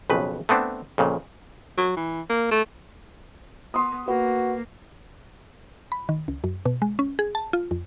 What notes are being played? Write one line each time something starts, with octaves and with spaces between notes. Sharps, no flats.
B1 F2 C#3 B4
A3 B3 C4 D4
F2 A#2 C#3
F#3
E3
A#3
A3
B3 C6 D#6
A#3 F#4 B4
B5
D#3
C#2
F#2
B2
G#3
C#4
G#4
A5
F4
F2